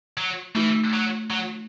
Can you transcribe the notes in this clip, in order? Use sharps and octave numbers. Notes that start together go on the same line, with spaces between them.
F#3
E3 A3 D#4 F#4
F#3
F#3